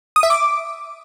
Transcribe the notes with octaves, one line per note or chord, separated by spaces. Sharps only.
D#6
E5
D6